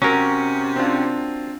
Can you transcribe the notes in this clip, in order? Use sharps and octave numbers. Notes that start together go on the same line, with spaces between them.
C3 F#3 C#4 A#4
C4 D4 F4